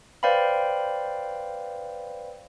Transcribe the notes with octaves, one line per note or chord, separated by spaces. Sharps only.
B4 C5 D5 F5 G5 B5